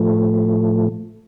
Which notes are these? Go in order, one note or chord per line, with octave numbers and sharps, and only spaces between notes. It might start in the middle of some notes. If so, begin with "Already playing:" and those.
Already playing: A2 F3 A3